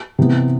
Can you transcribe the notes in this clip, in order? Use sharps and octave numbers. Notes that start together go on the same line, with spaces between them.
C3 E3 B3